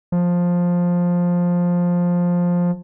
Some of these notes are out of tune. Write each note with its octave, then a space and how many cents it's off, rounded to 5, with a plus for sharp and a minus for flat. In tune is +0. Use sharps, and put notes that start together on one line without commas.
F3 +10